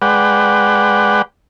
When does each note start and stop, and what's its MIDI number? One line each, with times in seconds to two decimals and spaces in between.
0.02 1.22 56
0.02 1.22 71
0.02 1.22 74
0.02 1.22 78
0.02 1.22 79